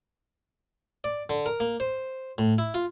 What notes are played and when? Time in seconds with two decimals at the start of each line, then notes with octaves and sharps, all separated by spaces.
1.04 D5
1.30 D3
1.46 A#4
1.60 A#3
1.80 C5
2.38 A2
2.58 E4
2.74 F4